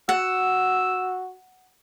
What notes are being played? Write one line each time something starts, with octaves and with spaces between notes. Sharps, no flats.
F#4 F#5 E6